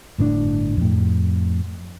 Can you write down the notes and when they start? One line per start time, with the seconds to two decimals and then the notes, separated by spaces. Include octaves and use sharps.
0.18 G1 A2 C#3 D4
0.77 F2 A2